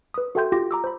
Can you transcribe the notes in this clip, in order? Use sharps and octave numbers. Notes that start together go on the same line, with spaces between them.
B4 D#6
F#4 A4 E5 G5 C6 G6
F4 G4 G5 C6 D6 A#6
A#5 D6 E6
C5 B5